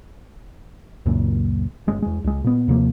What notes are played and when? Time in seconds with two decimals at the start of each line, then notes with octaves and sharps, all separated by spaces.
1.06 C#2 F#2 A#2
1.87 G1 G#3 C#4
2.02 E2 G#3
2.24 C#2 G#3
2.44 A#2 B3
2.68 D#2 C3 F3 A#3